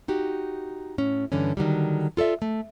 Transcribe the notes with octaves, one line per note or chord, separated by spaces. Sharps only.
D#4 F#4 G4
A2 C#4
G2 D3 E3 C#4
D3 D#3 F#3 G3
F4 A4 D5 E5
A3